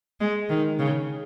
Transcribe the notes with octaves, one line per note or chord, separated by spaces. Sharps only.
G#3
D#3
C#3